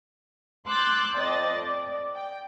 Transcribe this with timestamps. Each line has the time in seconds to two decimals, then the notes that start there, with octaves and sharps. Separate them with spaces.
0.67 C6 D6 E6 F#6 G6 A6
1.15 F2 D5 D#5 A6
1.52 D5
2.15 G5